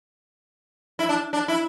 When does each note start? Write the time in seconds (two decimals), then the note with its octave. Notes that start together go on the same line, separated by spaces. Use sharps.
0.99 E4
1.09 D4
1.33 D4
1.48 E4